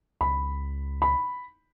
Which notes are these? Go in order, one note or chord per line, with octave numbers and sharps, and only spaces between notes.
C#2 B5
B5